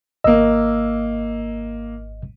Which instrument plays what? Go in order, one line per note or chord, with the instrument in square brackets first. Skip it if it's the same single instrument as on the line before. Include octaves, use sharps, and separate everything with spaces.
[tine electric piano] G#1 D#5 [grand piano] A#3 E6